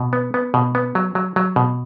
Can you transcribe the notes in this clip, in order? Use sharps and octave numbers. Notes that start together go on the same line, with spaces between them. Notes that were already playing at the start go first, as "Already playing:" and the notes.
Already playing: B2
B3
B3
B2
B3
F#3
F#3
F#3
B2